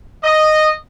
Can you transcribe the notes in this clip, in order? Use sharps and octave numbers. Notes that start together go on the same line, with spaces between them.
D#5